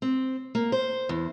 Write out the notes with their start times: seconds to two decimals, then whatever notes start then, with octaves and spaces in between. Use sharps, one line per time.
0.02 C4
0.55 A#3
0.72 C5
1.09 E2